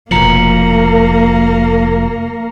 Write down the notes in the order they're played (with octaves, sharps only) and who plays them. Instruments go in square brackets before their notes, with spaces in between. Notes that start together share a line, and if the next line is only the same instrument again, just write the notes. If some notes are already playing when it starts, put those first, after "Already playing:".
[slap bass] F1 B2 F3 [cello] A#3 A#4 [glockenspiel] A#5 C#7 F#7